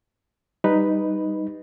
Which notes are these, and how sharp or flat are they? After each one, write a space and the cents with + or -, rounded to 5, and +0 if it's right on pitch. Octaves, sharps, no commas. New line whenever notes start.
G3 +0 D#4 +0 B4 +0